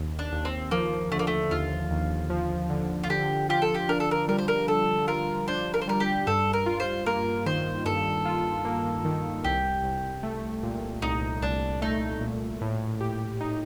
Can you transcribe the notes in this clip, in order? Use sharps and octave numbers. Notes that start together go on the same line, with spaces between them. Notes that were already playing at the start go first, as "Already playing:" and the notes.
Already playing: D#2
D4
D#2
C4
F3 A#3
D3 A3
A#3
A3
D#2 F4
D#2
F3
D3
F4
D3 G4
F4 G4
A4
G4
D4 A#4
A4
A#4
G3 A#4
C5
A#4
D3 A4
F4 A#4
D4 C5
A#4
C5
G3 A#4
G4
G2 A4
A#4
F4
C5
A#3 A#4
D#3 C5
G2 A4
F4
A#3
D#3
C2 G4
C2
A3
A#2
C2 D#4
C2 D4
A3 D#4
A#2
A2
G4
D#4